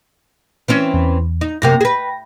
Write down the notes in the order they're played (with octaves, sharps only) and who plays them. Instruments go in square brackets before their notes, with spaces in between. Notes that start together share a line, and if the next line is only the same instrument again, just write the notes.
[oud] E3 C4 C#4
[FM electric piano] E2
[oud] D#4
[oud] F#2 C3 A#3 [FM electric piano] G5 A#6
[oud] G#4 B4